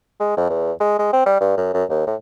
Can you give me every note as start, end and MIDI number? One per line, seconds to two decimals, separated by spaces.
0.20 0.34 56
0.37 0.49 41
0.50 0.72 40
0.80 0.94 56
0.99 1.10 56
1.13 1.23 60
1.26 1.38 55
1.40 1.54 43
1.57 1.73 42
1.74 1.84 42
1.90 2.05 39
2.07 2.15 45